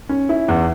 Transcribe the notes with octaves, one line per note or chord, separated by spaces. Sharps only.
C#4
E4
E2